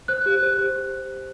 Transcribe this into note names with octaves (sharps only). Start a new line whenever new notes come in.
C5 F#6
G4
C5
G4